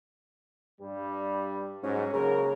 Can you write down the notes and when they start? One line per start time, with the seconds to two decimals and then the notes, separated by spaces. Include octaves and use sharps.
0.81 G2 G3
1.83 G#2 F#3 C#4
2.13 C#3 F#3 A#3 A#4